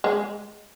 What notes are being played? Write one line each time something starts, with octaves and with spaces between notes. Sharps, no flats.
G#3